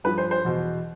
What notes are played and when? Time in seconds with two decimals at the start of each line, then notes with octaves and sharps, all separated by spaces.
0.04 G2 F3 B4
0.18 C5
0.31 C5
0.45 E2 B2